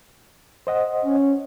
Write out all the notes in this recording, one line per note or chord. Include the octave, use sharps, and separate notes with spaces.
C5 D#5 F#5
C#4